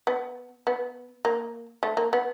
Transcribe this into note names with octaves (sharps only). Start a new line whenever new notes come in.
B3
B3
A#3
A3
A#3
B3